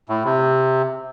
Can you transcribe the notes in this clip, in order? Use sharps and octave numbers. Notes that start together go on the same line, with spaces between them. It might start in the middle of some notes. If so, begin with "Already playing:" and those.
A2
C3